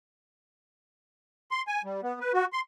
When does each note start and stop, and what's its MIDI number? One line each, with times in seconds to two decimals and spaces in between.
1.51 1.62 84
1.68 1.82 80
1.84 2.01 55
2.03 2.19 59
2.20 2.32 71
2.34 2.45 66
2.53 2.61 84